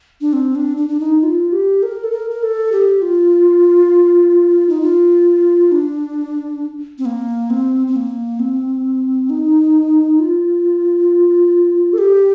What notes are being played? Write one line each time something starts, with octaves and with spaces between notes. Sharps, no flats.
D4
C4
D4
D4
D4
D#4
F4
G4
A#4
A4
A#4
A#4
A4
G4
F4
D#4
F4
D4
C4
A#3
C4
C4
A#3
C4
D#4
F4
A4
G4